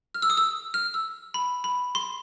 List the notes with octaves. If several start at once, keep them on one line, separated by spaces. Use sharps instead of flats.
F6
E6
D#6
E6
F6
E6
B5
B5
C6